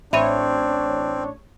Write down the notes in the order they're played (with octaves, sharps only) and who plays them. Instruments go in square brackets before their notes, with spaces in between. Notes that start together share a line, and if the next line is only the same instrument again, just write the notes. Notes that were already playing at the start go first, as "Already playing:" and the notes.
[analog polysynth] A1 C#5 [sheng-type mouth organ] C4 [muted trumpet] D4 [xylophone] E5 B5 D#7